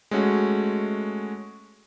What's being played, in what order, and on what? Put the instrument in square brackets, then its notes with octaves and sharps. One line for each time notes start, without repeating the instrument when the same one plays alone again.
[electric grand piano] G#3 A3 C#4 F#4